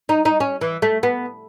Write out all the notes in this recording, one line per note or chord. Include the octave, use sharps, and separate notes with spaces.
D#4
D#4
C#4
E3
A3
B3